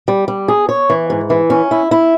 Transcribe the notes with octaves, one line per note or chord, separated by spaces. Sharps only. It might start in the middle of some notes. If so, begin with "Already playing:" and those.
G3
G3
G#4
C#5
E3
G#2
E3
C#4
E4
E4